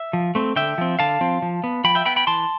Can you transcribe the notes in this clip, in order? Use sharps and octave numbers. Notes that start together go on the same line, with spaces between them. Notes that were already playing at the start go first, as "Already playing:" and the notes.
Already playing: E5
F3
A3 C4
D3 E5 G5
F3 C4
D3 F5 A5
F3 C4
F3
B3
F3 G5 B5
E5 G5
B3 G5 B5
G5 B5
E3 A5 C6